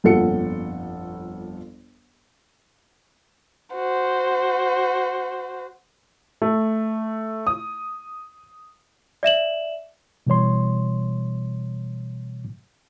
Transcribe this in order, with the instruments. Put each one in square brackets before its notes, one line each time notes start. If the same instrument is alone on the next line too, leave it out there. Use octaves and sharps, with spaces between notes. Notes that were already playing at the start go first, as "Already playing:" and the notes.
[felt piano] G1 F2 A#2 A4 F#5 C#7
[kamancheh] F#4 C5
[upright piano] A3
D#6
[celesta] D5 E5 E7 F#7
[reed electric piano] B2 E3 G3 C#5 C6